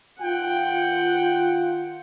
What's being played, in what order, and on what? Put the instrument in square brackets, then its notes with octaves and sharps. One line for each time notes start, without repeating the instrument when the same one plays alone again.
[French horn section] D#3 F4 [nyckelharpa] F#5 [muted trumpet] G5